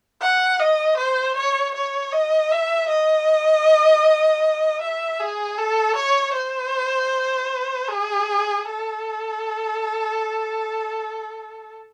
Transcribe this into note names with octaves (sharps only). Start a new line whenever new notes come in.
F#5
D#5
C5
C#5
C#5
D#5
E5
D#5
E5
G#4
A4
C#5
C5
G#4
A4